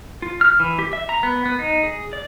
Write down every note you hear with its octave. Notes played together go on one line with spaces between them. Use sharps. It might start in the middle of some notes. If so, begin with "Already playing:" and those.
F4
F6
E3
G4
E5
A#5
B3
B3
D#4
G#4
D5